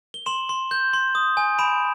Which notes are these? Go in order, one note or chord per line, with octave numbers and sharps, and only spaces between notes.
G7
C6 E7 F#7
C6
G6
C6
D#6
G#5
B5 D7 E7